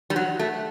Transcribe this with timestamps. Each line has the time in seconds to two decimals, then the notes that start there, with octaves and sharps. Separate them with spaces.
0.10 G3
0.16 F#3
0.39 A3